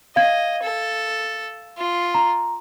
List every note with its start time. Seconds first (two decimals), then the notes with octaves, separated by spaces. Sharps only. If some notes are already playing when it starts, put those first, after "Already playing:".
0.16 D#5 F5 G#6
0.63 A4
1.78 F4
2.14 A#5